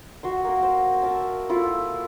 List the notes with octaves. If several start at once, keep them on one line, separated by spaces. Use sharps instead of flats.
F#4 E5 C6
A#3 A#4
C5
A#4 E5 A5
A#3 E4 F4 A4